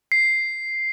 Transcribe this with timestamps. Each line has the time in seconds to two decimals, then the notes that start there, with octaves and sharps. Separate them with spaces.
0.12 C7